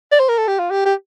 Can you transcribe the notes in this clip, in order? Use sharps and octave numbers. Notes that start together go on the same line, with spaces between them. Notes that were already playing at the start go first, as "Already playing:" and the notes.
D5
C5
A#4
A4
G4
F4
G4
G4